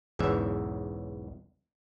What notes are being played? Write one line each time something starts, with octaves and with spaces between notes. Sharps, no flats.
B1 E2 G#2 C#3 E3 E5